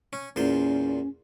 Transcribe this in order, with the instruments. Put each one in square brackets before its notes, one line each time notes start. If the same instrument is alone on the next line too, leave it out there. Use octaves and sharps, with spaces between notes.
[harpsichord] C#4
[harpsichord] E2 A#2 C5 [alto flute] C#4